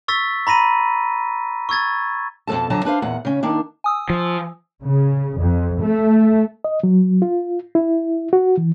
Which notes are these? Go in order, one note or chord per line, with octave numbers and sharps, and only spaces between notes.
C#6 E6 A6 B6
A#5 B5 A#6 D#7
C#6 E6 G#6 A6
F2 B2 F3 A4 A5
F2 D3 F#3 A5 A#5
D4 B4 C5 F5
E2 A#2 F#5
C#3 C#4
D#3 A#3 D4
G#5 D#6 E6
F3
C#3
F2
A3
D#5
F#3
F4
E4
F#4
E3